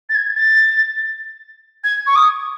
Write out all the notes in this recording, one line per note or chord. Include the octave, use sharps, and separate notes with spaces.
A6
G#6
A6
G#6
C#6
D#6